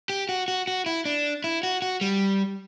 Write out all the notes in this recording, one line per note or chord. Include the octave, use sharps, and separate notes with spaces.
G4
F#4
F#4
F#4
E4
D4
E4
F#4
F#4
G3